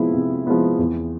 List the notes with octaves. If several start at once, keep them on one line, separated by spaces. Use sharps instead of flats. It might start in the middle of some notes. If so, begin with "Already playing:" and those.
Already playing: C3 F3 G#3 B3 E4
C3
F3 G#3 B3 E4
E2